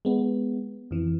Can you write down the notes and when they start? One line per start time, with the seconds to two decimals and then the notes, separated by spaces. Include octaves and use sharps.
0.05 G#3 B3
0.91 F2 E3